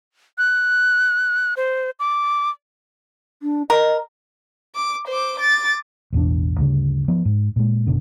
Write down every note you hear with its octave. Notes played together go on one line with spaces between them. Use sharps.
F#6
C5
D6
D4
A#4 D#5
D6
C5 D6
D6 A6
A1 E2 B2 D4
D2 G2 C#3
F3 B3
G#2
A#2 G#3
F#1 B2 D3